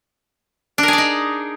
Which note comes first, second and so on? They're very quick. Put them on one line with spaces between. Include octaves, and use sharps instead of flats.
D4 A#4 G#4 D5 D#4